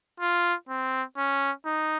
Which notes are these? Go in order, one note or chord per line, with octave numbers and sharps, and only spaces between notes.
F4
C4
C#4
D#4